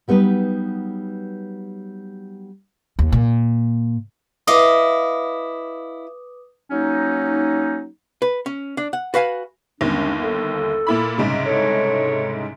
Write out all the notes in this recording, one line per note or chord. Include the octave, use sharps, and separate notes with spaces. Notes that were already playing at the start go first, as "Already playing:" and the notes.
F#3 G3 B3 D#4 B4
D#2
A#2
E4 B4 D#5 F5 D6 D#6
F#3 A#3 C#4 D#4
B4
C#4
D4
F#5
F#4 B4 F5 G#5
G1 D#2 G#3 C#4 D4
A4
A#2 E4 B5
C2 G#2 C#3
A4 C#5